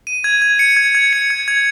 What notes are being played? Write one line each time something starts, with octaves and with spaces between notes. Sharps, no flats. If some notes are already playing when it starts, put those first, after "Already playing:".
D#7
G#6
G#6
C#7
G#6
G#6
C#7
G#6
G#6